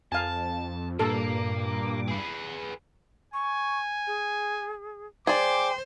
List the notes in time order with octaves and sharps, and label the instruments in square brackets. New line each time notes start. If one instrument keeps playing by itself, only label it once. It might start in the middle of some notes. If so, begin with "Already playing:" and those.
[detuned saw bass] F2 [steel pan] F5 G#5 [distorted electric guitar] A5
[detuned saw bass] G2 [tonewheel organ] A#2 D6 [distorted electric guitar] A#3 [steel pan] A4
[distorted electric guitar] G#4 B4
[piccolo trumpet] G#5 [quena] C#6
[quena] G#4
[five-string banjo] G#4 D5 [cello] C5 [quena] G5 [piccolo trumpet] D6